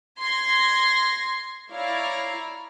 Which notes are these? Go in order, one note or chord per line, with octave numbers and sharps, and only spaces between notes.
C6 G#6 A#6
E4 C#5 D5 F5 A#5